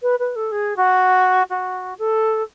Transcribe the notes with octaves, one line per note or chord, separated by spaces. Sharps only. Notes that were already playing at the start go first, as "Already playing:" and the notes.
B4
B4
A4
G#4
F#4
F#4
A4